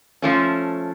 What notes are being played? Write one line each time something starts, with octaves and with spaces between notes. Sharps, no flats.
F3 A3 C#4